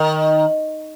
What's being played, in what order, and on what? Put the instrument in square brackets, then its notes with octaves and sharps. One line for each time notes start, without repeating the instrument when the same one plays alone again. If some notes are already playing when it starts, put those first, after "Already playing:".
Already playing: [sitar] D#3